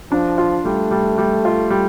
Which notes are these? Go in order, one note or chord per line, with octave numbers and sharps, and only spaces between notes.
F3 D4
F4
G3 A3
G3
G3
F4
G3